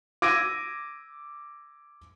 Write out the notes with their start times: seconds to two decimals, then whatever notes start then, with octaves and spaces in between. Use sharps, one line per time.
0.22 D6 E6 G#6 A#6 D7 D#7